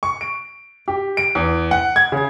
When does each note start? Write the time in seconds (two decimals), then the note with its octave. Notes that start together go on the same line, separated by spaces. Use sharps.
0.03 C#6
0.21 D7
0.88 G4
1.17 D7
1.35 E2
1.71 F#5
1.96 G#6
2.12 C#3